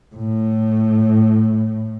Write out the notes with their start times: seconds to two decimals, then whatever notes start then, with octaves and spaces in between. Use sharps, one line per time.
0.15 A2